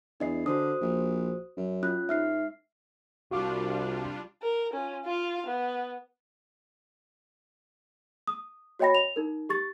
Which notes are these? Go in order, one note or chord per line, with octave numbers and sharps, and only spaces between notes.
E2 D4 D#5 C7
D3 F#4 C5 D#6
A#1
F#2
C#4 F4 F#6
G#2 E5 F6 C7
C2 G3 D4 F4 F#4 F5 D6
A#4
C#4 F4
F4 F5
B3
D#6
F#4 C#5 D#5 G5 B5 A#6
F7
D#4 A#4
G4 C#6 A6